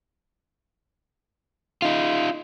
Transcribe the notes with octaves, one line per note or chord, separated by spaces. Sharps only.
D#4 F4